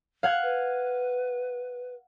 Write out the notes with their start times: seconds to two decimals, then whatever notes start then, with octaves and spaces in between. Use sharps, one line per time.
0.23 F5 F#5 G#6
0.42 B4